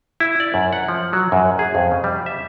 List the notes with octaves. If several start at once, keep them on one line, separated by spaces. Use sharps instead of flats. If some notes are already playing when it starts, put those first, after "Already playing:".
E4
D5
F#2
F#5
F3
F#3
F#2
G#4
F2
C#3
G3
E5